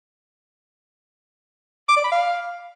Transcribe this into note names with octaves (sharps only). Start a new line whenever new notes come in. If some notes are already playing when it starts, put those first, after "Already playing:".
D6
D5
B5
F5